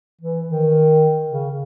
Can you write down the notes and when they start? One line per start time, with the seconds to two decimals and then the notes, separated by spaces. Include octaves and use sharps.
0.21 E3
0.49 D#3
1.30 C#3